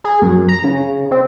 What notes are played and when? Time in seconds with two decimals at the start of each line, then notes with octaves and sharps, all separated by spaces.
0.04 G#4
0.22 F#2
0.48 A#5
0.64 C#3
1.11 C4